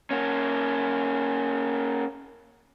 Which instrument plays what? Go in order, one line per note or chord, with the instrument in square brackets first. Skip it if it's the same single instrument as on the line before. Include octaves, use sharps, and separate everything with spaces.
[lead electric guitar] A#3 C#4